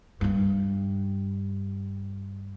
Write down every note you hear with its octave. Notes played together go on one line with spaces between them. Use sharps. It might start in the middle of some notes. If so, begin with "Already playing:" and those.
G2 D4